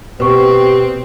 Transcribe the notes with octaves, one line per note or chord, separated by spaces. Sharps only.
B2 C4 G4 B4 C#6